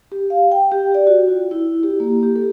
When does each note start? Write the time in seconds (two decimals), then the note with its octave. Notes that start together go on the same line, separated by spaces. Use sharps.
0.12 G4
0.30 F5
0.52 G5
0.72 G4
0.95 D5
1.07 F#4
1.28 F4
1.51 E4
1.83 G4
2.00 A#3
2.23 G4
2.36 A4